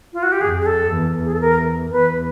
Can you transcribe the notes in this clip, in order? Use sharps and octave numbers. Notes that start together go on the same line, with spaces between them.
F4
F#4
G4
F2 G#4
G#4
A4
E2
G#4
A4
A#4
E2 B4